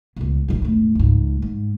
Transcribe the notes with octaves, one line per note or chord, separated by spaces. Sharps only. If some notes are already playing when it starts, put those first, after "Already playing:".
C#2 B2
E1 B1
E1 A2
C#2 G#2
G#2